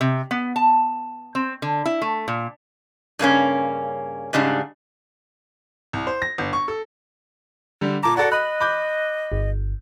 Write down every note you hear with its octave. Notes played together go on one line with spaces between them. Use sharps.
C3
B3
A5
C4
D3
E4
A3
A#2
G2 C#3 A#3 C#4
G#2 C#3 G3 D4
C2
C5
A#6
G1
C#6
A4
D3 G3
A#2 A5 A#5 D6
F#4 A4 D5 F#5
D#5 B5 F#6
B5 D6 G6
G1